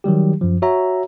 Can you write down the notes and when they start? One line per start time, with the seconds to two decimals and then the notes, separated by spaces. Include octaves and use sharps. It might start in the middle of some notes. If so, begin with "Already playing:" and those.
0.04 D#3 F#3 G3 G4
0.41 F#2 F3
0.62 F#4 C#5 E5 A#5